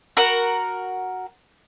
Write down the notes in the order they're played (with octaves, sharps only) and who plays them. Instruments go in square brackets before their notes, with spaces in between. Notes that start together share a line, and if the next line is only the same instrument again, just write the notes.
[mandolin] F#4 A#4 F#5